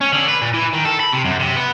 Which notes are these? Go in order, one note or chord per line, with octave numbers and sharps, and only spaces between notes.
C#4
D3
B4
A#2
E3
D#3
A4
B5
C3
F#2
C3
B3